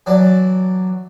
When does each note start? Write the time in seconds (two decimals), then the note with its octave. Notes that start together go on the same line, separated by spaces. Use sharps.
0.06 E3 F#3 D5 A5